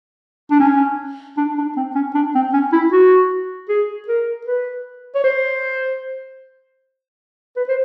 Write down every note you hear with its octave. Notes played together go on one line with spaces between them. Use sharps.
D4
C#4
D4
D4
C4
C#4
D4
C4
C#4
E4
F#4
G#4
A#4
B4
C#5
C5
B4
C5